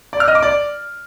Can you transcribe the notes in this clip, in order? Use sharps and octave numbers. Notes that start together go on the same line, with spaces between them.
D5
F6
D#5
D6
D5